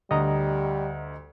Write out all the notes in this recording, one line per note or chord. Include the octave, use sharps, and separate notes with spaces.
D2 G3 D#5 A#5